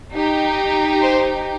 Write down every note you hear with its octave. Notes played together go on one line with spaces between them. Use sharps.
D#4 G4
C5